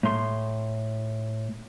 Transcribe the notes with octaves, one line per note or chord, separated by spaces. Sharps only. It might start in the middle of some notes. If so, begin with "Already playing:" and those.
A2 C6